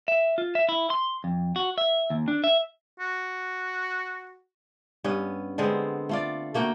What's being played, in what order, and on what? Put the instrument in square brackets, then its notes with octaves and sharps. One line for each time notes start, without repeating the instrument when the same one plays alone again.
[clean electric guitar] E5
F4
E5
E4
C6
F2
F#4
E5
D#2
D4
E5
[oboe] F#4
[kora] G2 B3 C#4
D3 G#3 B3 C4
A3 F4 D5
A3 A#3 F#4 G5